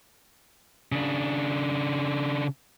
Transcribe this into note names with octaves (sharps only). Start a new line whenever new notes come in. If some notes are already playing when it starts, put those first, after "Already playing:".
C#3 D4